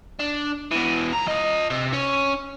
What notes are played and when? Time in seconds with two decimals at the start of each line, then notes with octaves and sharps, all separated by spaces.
0.19 D4
0.71 B2 E3
1.13 F2 A#5
1.27 F4 D#5
1.70 C3
1.93 C#4 C#5